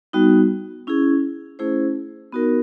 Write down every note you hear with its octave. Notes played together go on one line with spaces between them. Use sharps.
G3 B3 D#4 F#4
C#4 E4 G#4
A3 C#4 E4 G#4 C5
B3 D#4 F#4 A#4